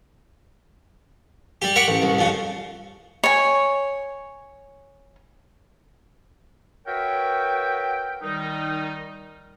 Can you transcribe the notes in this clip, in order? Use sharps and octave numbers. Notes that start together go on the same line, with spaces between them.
G3 G4
A#4 F#5 B5 C#6 D6
A1
C2
F2 C#3
C#5 G#5
F#4 A#4 B4 C#5 E5 G5
D#3 G3 D#4